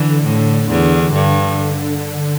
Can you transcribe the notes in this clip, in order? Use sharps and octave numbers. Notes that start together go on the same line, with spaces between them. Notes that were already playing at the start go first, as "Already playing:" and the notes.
Already playing: D3 E3
A2
E2
G2 D3